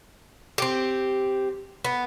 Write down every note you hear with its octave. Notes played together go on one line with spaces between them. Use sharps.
C4 G4
B3